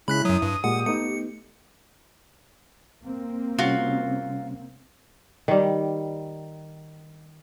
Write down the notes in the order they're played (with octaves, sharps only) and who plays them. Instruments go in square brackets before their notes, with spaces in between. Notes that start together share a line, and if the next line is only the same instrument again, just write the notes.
[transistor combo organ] C#3 G#3 [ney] E4 [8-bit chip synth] B5 F#6 B6
[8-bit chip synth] F#2 F#3 [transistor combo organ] D#6
[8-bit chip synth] G2
[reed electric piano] A#2 G#3 [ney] G4 [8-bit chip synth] F#5
[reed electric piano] A3 B3 D#4 [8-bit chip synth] C#7
[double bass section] A#3 C4
[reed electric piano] C3 G3 C#4 [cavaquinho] F4 F#4
[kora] D#3 G3